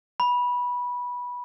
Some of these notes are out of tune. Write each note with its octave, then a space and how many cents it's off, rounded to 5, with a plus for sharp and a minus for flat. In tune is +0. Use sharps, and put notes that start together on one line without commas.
B5 -15